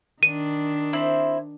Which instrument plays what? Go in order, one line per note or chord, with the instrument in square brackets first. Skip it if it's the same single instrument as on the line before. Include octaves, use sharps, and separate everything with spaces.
[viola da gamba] D#3 D4 [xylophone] D#7
[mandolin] C4 E4 C5